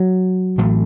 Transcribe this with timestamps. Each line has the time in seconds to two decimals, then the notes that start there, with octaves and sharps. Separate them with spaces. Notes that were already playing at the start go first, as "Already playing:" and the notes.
Already playing: F#3
0.58 A2 E3 A3 C4